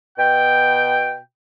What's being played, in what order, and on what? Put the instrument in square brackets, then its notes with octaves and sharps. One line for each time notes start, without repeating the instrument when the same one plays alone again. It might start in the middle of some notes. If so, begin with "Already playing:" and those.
[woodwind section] B2 G5